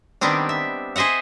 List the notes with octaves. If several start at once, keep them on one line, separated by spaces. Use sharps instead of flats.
D#3 G3 B3 C4 D4
E5
G#4 C5 D#5 E5 F#5